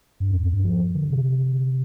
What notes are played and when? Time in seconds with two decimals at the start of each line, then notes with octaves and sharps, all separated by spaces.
0.20 G2
0.31 F2
0.43 F2
0.53 G2
0.65 F3
0.95 D3
1.10 C3